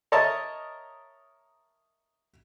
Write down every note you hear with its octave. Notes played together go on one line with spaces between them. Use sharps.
A#4 C#5 D#5 E5 A5